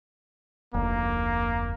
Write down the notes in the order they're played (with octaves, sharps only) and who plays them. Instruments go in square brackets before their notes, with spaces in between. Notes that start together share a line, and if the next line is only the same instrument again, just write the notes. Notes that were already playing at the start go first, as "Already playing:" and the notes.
[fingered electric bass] F1 D2 [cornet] A#3